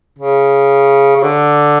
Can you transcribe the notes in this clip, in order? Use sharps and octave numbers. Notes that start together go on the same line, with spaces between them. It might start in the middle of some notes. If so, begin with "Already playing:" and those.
C#3
C#3
D3